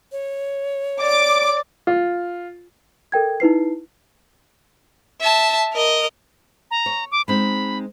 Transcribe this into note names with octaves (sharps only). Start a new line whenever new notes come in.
C#5
D5 D6
F4
A4 A#4 G5 G#6
D#4 E4 B4 C7
E5 A5
A#4 D#5
A#5
C#5
D6
G#3 C4 D#4 B5